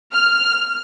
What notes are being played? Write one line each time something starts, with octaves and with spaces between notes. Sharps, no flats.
F6